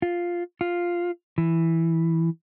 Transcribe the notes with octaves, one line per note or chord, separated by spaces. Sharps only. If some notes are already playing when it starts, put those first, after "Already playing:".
F4
F4
E3